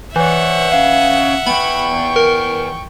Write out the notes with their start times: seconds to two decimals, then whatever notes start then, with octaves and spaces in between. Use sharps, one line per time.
0.16 E3 C5 C#5 E5 F#5
0.72 C#4 F5
1.46 E3 B3 G5 B5 C#6
2.16 A#4